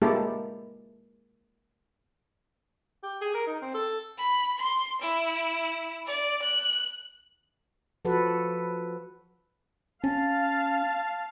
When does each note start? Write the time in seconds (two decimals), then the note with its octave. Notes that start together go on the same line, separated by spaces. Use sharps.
0.02 G#3 A#3 E4 G4 A4
3.03 G4
3.21 G#4
3.34 A#4
3.47 D#4
3.62 C4
3.74 A4
4.18 B5
4.59 C6
5.02 E4
6.06 D5
6.42 F#6
8.05 F3 F#4 A4 B4
10.04 C#4 F5 A5